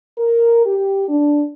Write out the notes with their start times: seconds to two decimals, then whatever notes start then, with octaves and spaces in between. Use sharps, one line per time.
0.18 A#4
0.66 G4
1.09 D4